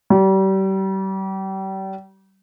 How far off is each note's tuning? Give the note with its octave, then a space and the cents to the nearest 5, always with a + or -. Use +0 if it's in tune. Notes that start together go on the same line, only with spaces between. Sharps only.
G3 -35